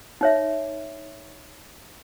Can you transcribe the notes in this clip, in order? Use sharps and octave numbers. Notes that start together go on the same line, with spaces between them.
D#4 C#5 E5